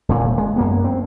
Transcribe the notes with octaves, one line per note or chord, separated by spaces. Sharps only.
D#1 A#2
G#3
F#2 A#3 B3
C4